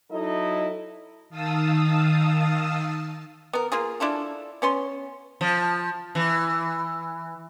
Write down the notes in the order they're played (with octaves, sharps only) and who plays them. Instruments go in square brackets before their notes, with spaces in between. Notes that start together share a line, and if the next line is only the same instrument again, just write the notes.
[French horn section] F#3 D#4 E4 A4 D#5
[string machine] D#3 F5 A5 D#6 E6
[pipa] B3 A#4
A#3 F4 G#4
D4 E4 F4 A4
B3 C#4 C6
[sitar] F3
E3